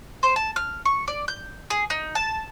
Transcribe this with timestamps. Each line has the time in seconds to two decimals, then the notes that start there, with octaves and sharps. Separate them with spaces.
0.23 C5
0.36 A5
0.56 F6
0.86 C#6
1.08 D5
1.28 G6
1.70 G#4
1.90 D#4
2.15 A5